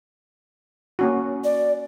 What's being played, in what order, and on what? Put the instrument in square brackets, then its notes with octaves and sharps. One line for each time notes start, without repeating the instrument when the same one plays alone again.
[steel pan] A#3 C#4 F#4
[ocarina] D5